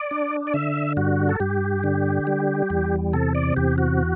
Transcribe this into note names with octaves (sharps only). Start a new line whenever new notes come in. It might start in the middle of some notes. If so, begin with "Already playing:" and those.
Already playing: D5
D4
D5
D3 E5
G2 F#4
A4
G2 G4
D3
G3
E2
C3 A4
D5
E2 G4
F#4